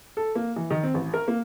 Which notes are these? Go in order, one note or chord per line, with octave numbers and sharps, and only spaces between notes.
A4
A#3
E3
D#3
C4
A1
A#4
A#3